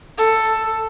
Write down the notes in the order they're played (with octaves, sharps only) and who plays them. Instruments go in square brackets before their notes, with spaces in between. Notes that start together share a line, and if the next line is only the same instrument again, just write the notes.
[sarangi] A4